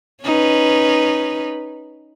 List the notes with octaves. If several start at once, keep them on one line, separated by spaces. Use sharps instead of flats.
C#4 D#4 B4